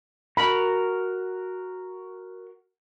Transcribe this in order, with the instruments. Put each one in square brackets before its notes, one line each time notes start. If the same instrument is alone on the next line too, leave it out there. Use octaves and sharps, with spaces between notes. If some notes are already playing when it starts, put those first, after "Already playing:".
[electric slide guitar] F#4 A#4 [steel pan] B5